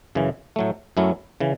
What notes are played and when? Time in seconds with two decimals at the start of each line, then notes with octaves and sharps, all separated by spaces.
0.15 F#2 C#3 E3
0.56 A2 F#3 A3
0.97 F#2 F#3 A3 C#4 E4
1.40 C#3 E3